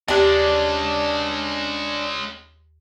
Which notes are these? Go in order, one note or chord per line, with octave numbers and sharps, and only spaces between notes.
D#2 G#3 C#4 D4 G4 D5 F#6